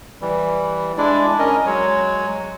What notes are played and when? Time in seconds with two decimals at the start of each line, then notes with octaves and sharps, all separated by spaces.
0.21 E3 G3
0.98 G#3 D4 E4 D5
1.39 C#4 A#4 D#5
1.66 F#3 G#3 C#5